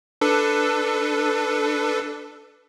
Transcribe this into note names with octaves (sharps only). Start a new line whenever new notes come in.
D4 A4 B4